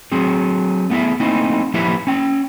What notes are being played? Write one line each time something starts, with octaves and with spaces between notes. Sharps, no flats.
F#3 C4 G#4
A3 B3 E4 G#4 E5
A3 A#3 C4 D#4 E4
F3 A#3 E4 G4 B4 E5
C#4 G5